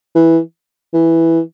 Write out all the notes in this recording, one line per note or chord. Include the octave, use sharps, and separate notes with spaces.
E3
E3